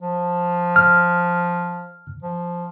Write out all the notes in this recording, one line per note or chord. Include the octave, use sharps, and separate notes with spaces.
F3
F6
F3